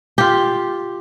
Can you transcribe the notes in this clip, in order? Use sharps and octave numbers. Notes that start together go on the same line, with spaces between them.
F4 G4